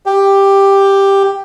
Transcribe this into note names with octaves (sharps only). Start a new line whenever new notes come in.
G4